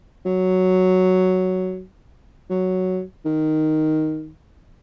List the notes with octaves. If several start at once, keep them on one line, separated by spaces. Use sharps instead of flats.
F#3
F#3
D#3